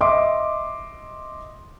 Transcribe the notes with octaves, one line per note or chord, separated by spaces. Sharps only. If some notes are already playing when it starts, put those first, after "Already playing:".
D#5 E5 C6 D6